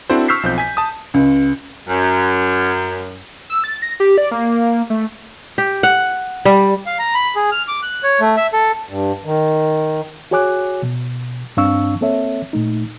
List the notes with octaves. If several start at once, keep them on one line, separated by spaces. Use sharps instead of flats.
C4 D4 E4 F#4 A4 C5
C#6 E6 F6 G6 B6 C7
B1 F3 C4 G6
G#5 B6
A5 D#6
C#2
F#2
E6
A6
A#6
G4
D5
A#3
A3
G4
F#5
G3
F5
A#5
B5
G#4
F6
D6
F#6
C#5
A3
E5
A4
G2
D#3
F#4 G#4 C#5 G#5 D6 F#6
B2
G2 C4 D4 F5 C#6 E6
A#3 C4 A4 C#5 E5
A#2 A3 D#4